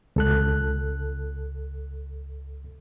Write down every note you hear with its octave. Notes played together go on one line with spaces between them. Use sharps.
C#2 A4 F#6